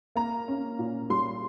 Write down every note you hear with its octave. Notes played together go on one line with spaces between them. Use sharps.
A#3 A#5
C#4
A#2
G3 C6